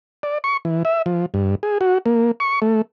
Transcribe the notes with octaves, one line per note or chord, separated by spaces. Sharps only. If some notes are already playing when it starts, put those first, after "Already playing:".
D5
C#6
E3
E5
F3
G2
G#4
F#4
A#3
C#6
A3